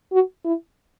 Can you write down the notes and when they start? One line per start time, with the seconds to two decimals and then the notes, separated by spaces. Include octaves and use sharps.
0.12 F#4
0.45 E4